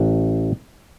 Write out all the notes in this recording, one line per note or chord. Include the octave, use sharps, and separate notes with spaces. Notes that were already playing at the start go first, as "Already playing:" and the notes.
Already playing: A1